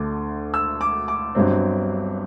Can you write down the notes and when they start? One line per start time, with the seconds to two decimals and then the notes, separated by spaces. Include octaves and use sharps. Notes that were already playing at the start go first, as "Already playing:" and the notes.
Already playing: D2 D3 A3 D6
0.54 E6
0.81 D6
1.08 D6
1.35 G1 G2 F#3 C4